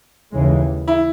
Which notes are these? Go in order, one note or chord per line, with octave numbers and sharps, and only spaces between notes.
D#2 C#3 E3 G#3
E4